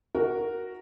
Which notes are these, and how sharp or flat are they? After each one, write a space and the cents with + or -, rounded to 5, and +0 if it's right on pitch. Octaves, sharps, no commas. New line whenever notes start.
F#4 +0 A#4 +0